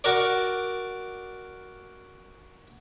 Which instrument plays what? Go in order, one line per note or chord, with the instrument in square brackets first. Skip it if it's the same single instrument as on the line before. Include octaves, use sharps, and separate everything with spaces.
[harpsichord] F#4 A#4 D5